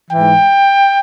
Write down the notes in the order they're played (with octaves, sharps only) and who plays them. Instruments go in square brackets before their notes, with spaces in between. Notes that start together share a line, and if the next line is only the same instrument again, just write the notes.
[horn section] G#2 E3 G5